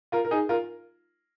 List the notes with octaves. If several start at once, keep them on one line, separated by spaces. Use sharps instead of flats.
F4 A#4
A#4
D#4 G#4
F4 A#4